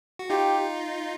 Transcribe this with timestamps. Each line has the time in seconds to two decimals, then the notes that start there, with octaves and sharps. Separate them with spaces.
0.19 F#4
0.30 D#4 F4 G4